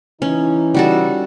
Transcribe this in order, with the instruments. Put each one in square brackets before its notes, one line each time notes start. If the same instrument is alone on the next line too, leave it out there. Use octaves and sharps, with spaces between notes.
[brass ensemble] E3 D#4 [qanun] C#4
[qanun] G3 F#4 A4